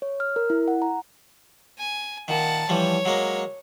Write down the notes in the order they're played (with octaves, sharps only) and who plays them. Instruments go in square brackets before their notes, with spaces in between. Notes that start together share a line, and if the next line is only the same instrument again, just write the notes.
[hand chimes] C#5
F6
A#4
E4
F#5
A#5
[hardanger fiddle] G#5
[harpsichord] A#2 D#3 [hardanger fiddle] F#5 A5
[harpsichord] E3 F3 G3 [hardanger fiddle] C#5
[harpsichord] F#3 G#3 A#3